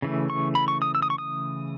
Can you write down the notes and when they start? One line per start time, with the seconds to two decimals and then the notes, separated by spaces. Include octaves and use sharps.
0.02 C#3 E3 A3
0.30 C#6
0.55 B5
0.68 C#6
0.82 D#6
0.95 E6
1.02 D#6
1.10 C#6
1.18 D#6